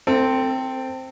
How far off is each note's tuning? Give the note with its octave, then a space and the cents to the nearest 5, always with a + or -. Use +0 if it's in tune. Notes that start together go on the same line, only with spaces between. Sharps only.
C4 +0 A4 +30